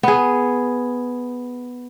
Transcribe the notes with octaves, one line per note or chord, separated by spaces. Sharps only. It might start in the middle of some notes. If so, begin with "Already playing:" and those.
B3 G#4